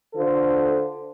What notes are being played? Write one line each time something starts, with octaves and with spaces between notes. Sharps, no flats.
D3 F4 A4 C5